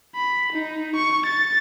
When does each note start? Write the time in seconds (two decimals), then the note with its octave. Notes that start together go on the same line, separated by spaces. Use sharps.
0.16 B5
0.52 D#4
0.95 C#6
1.26 A6